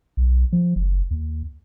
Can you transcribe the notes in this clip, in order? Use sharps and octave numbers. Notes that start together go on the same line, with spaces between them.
B1
F3
F#1
D#2